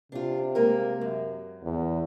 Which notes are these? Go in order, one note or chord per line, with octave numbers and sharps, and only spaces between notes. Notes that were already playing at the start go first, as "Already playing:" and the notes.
C3 D4 F4
G#3 A#3 A#4
F#2
E2